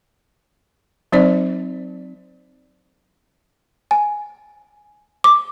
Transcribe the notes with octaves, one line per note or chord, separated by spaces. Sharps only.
F#3 C4 D#4 C5 D5
G#5
D6